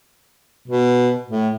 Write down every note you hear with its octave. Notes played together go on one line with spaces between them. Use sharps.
B2
A2